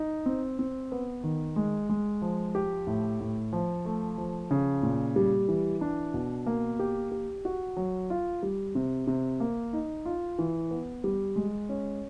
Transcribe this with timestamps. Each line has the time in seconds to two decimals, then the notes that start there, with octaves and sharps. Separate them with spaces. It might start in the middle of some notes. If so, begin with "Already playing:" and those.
Already playing: D#4
0.26 C4
0.59 C4
0.92 B3
1.24 D#3
1.56 G#3
1.89 G#3
2.22 F3
2.55 G4
2.87 A2
3.20 A2
3.53 F3
3.85 A3
4.18 F3
4.51 C#3
4.83 A#2
5.16 G3
5.48 E3
5.81 D4
6.14 B2
6.46 A#3
6.79 G4
7.12 G4
7.45 F#4
7.77 F#3
8.10 F4
8.43 G3
8.75 C3
9.07 C3
9.40 A#3
9.73 D#4
10.05 F4
10.39 E3
10.71 B3
11.04 G3
11.36 G#3
11.69 C#4